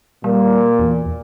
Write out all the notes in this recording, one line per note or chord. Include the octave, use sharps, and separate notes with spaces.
A#2 G3
E2